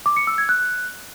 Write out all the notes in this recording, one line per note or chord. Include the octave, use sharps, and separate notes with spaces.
D6
C#7
E6
G#6
F#6